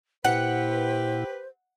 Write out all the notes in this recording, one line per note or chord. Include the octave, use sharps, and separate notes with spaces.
A#2 E4 G4 B4 C5 F#5